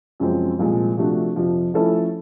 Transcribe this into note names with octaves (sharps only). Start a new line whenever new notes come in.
F#2 C#3 F3 G#3 C4
C2 A#2 F3 G#3
C3 F3 A3 D4 F#4
F2 C3 F3
F3 A3 C#4 E4 A4